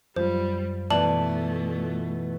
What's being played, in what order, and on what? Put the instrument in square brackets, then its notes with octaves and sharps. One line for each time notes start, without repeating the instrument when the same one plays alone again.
[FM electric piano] F#2 F3 F4 [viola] G3 [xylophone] C5
[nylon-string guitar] B2 E3 [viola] A3 [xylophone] D5 A5 F#7